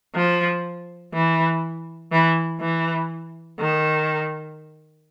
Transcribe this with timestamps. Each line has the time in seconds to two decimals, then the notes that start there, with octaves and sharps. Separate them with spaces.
0.15 F3
1.14 E3
2.12 E3
2.61 E3
3.59 D#3